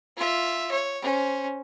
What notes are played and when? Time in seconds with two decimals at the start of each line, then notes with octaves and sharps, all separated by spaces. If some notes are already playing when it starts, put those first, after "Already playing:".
0.17 F4 E5
0.71 C#5
1.02 C#4 C5